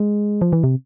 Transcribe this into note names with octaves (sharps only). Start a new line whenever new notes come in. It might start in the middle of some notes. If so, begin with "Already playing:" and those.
Already playing: G#3
F3
E3
C3